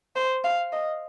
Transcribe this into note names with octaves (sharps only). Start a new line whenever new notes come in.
C5
F5
D#5